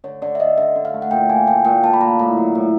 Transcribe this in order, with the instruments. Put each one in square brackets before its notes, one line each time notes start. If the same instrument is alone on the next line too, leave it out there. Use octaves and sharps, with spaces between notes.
[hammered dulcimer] D3 [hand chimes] C#5
[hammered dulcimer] D3 [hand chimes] D5
[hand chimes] E5
[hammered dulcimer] D3 [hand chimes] D#5
[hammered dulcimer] D3 [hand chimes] E5
[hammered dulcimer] D3
[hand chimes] F5
[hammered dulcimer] A3
[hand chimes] F#5
[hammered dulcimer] A#2 [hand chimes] G5
[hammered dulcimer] A#3 [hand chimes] G#5
[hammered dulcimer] A#2 [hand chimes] G5
[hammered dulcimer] A#2 [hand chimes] G5
[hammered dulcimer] A#3 [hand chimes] A5
[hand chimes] B5
[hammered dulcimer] A#2 [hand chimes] A#5
[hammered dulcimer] A2 [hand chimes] A#5
[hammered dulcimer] F#3
A2